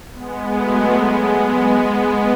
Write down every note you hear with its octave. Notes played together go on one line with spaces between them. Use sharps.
G#3 B3
F#3 A3
G#3 B3